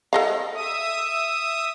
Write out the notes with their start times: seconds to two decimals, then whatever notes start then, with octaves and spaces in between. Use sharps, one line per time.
0.13 A4 D#5 F5
0.54 E5 D#6